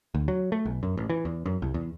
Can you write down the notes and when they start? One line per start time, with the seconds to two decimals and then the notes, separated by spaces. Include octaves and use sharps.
0.14 D2
0.28 F#3
0.52 A3
0.66 B1
0.83 F#2
0.97 A1
1.10 E3
1.25 E2
1.46 F#2
1.62 C2
1.74 E2